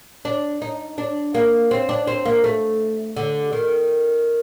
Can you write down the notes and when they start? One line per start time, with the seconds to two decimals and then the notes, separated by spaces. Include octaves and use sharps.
0.25 D4
0.62 D#4
0.98 D4
1.34 A#3
1.71 C4
1.89 D4
2.07 C4
2.25 A#3
2.44 A3
3.16 D3
3.53 D#3